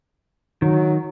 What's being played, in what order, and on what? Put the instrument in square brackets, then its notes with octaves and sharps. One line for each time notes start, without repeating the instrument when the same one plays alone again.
[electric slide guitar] D#3 [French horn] F#3